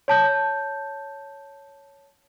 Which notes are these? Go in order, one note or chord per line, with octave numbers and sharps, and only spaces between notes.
C#5 A5 G6